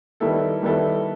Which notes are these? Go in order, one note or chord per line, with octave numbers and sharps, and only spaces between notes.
D#3 G3 B3 E4 A4
D#3 G3 B3 E4 A4